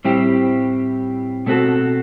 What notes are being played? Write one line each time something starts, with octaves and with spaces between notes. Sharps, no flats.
A2 G3 C4 E4 G4
B2 A3 C4 F#4 A4